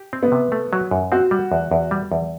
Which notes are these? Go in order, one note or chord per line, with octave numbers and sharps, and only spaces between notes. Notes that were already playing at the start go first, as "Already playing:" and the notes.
Already playing: G4
C4
B3
C3
A3
F#3
F#2
C4 F#4
G3
E2
E2
G3
E2